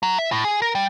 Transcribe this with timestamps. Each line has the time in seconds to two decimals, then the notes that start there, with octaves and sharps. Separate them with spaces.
0.03 F#3
0.18 E5
0.32 A2
0.44 G#4
0.62 A#4
0.75 G3